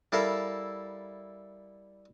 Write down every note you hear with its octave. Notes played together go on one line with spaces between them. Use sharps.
G3 E4 A4 A#4 E5 F5